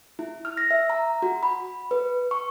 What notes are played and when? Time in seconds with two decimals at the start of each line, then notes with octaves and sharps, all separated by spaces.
0.19 E4
0.45 F6
0.57 A#6
0.71 E5
0.90 A#5
1.22 F#4
1.43 B5
1.91 B4
2.31 C#6